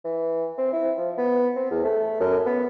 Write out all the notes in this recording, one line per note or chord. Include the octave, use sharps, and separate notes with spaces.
E3
C4
E4
F3
B3
C4
E2
A3
F#2
B3